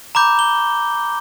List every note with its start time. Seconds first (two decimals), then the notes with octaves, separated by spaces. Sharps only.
0.15 A#5 B5 D6 G6
0.39 G7